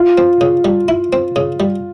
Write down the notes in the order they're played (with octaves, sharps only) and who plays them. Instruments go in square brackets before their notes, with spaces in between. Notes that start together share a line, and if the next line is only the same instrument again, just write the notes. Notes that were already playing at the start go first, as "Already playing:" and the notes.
Already playing: [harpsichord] E4 [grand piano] F4
[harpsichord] C4
C#3
G3
E4
C4
C#3
G3